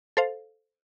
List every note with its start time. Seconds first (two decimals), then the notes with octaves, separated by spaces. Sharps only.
0.17 A4 C5 F5